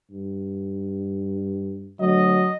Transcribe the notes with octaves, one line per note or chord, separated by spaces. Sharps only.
G2
D2 F#3 D#5